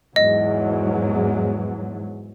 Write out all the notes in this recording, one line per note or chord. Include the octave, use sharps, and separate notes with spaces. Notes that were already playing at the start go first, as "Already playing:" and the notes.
E2 G#2 F#3 D#5